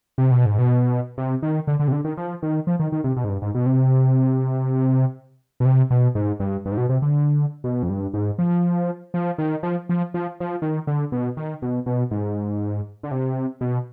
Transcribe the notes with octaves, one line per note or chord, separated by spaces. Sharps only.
C3
B2
G#2
B2
C3
D#3
D3
D3
C3
D3
D#3
F3
D#3
F3
D#3
D#3
C3
B2
G#2
G2
G#2
B2
C3
B2
C3
B2
G#2
G2
G2
G#2
B2
C3
D3
B2
F2
G2
G#2
F3
F3
D#3
F3
F3
F3
F3
D#3
D3
B2
D#3
B2
B2
G#2
D3
C3
B2